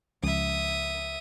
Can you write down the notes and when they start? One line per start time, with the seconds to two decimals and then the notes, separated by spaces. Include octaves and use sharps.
0.23 C#2 F3 E5 D#6